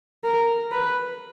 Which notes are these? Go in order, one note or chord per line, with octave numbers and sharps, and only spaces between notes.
A#4
B4